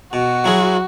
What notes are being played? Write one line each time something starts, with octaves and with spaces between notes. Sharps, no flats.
B2 F#4
F#3 E4 G#4